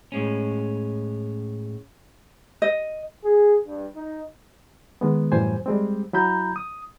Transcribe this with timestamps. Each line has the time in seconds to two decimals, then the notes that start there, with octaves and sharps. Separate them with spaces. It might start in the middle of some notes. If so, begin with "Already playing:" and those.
0.12 A2 G#3 C#4
2.62 D#5
3.24 G#4
3.67 G2
3.96 D#4
5.01 D#3 G#3 B3
5.32 F#2 A2 E3 G3 C5 G#5
5.66 G3 G#3 C4
6.13 F#3 E4 A#5 B5 G6
6.56 D#6